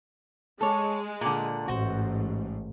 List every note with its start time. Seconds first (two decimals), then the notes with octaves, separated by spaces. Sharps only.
0.61 G#3 A4 C#5
1.21 A#2 D3
1.68 A1 G#2 F#4 C5